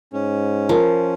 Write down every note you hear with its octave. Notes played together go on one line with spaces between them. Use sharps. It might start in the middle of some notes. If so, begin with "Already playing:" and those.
G#2 C#4
F3 A#4